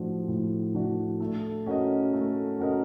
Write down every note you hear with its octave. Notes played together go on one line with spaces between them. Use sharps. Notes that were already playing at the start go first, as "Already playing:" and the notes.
Already playing: A2 F3 A3 D4 F#4
A2
F3 A3 D4 F#4
A3
C#4 F#4 A#4 D#5
A3
C#4 F#4 A#4 D#5